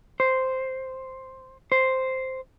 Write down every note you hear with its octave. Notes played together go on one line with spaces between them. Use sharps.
C5
C5